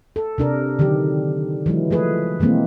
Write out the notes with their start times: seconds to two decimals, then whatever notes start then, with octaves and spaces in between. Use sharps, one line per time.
0.16 A4
0.38 C3 D4 A#4
0.79 D3 D#3 F#3 G4
1.66 E3 F#3 G#3
1.91 F3 A3 G#4 B4
2.40 B2 E3 G#3 A#3 C4